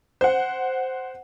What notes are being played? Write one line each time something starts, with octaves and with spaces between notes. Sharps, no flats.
C5 F#5